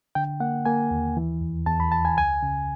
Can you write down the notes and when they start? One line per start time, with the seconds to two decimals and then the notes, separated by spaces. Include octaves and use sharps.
0.15 D3 G5
0.40 A#3 F#5
0.66 A#3 G#5
0.91 D#2
1.17 E3
1.41 E2
1.66 E2 A5
1.80 B5
1.92 E2 A5
2.05 G#5
2.17 C#2 G#5
2.43 C#3